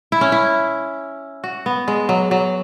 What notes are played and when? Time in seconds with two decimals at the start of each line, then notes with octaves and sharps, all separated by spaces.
0.12 E4
0.21 C#4
0.32 E4
1.44 F#4
1.66 B3
1.88 G#3
2.09 F#3
2.31 F#3